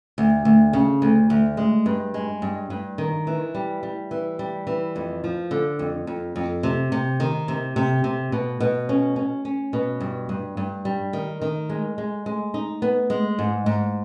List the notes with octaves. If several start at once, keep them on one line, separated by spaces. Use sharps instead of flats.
D2
D2
C#3
D2
D2
G#3
G2
G#3
G2
G2
D#3
E3
G3
G3
E3
G3
E3
F2
F3
D3
F2
F2
F2
C3
C3
D#3
C3
C3
C3
B2
B2
C#4
C#4
C#4
B2
G2
G2
G2
G3
D#3
D#3
G#3
G#3
G#3
D#4
B3
G#3
G#2
G#2